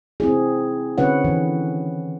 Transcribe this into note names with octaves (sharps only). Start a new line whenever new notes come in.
C4 E4 G#4
D3 C4 C#4 B4 C#5 F#5
D#3 E3